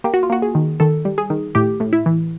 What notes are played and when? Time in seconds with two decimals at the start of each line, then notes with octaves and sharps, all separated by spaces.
0.04 A#3 G4
0.14 F#4
0.23 F4
0.30 A#3 F#4
0.42 G#4
0.55 D#3
0.80 D#3 A4
1.05 G3
1.18 G#4
1.30 D#3
1.55 A2 G4
1.80 A2
1.93 E4
2.06 E3